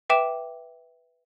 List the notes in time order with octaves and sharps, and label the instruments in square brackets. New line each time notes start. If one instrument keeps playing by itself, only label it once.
[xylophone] B4 E5 G5 D6 E7